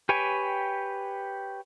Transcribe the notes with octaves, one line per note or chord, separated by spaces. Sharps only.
G4 B4 C#5 G5 G#5